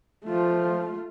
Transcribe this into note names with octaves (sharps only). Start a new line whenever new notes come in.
F3 A3 F4